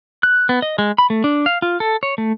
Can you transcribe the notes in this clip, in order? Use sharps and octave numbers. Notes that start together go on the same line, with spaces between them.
F#6
B3
D#5
G#3
B5
A3
D4
F5
F4
A4
C#5
A3